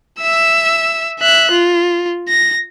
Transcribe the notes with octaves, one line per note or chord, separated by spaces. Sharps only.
E5 E6
E5 F#6
F4
A#6